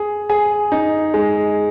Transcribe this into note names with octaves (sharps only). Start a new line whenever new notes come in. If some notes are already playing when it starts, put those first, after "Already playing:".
Already playing: G#4
G#4
D#4
G#3